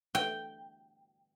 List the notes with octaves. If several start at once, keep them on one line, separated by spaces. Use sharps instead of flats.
G5